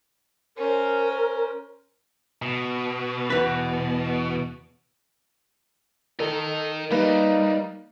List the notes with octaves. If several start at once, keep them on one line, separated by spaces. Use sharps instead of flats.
C#4 A#4 C5
B2
E2 B4
A4 A#4 D#5
G3 A#3 D#4 B4